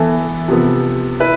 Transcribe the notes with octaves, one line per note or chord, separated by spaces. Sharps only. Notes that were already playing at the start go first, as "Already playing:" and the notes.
Already playing: E3 B3 E4 A4
C3 F3 B3
E4 B4